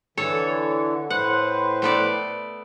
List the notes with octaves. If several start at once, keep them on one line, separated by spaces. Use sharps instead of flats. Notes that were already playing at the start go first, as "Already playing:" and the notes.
D3 E3 A4 C#5
A2 B4 C5 F#5
A3 B3 D5